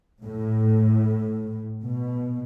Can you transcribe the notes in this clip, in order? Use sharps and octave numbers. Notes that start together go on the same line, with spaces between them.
A2
B2